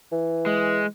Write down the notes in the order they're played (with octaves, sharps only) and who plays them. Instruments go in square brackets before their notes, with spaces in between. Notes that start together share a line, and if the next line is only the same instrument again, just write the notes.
[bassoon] E3
[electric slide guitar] G#3